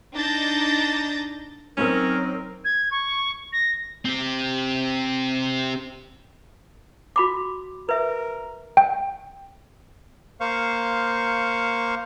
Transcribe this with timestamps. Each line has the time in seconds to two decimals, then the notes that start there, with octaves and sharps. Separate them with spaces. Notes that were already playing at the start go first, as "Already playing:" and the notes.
0.14 D4 D#4 G6 A6 A#6
1.77 F#3 C4 C#4 D#4 A#4
2.64 G#6
2.91 C#6
3.52 A#6
4.05 C4 G4
7.16 F#4 B5 D6
7.89 A#4 B4 E5
8.77 G5
10.40 A#3 C5 F5 C#6